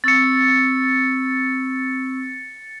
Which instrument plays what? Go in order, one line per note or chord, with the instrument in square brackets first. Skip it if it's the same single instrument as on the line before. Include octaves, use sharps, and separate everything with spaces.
[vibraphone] C4 C#6 E6 [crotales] A6 C#7